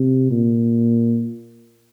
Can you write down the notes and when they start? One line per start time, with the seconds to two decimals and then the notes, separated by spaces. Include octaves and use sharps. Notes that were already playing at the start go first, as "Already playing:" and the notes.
Already playing: C3
0.31 A#2